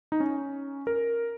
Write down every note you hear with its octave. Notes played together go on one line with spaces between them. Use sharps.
D#4
C#4
A#4